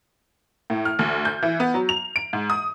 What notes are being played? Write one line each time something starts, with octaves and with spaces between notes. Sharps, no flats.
A2
F6
D2
G6
E3
B3
F#3
F7
D7
G#2
D#6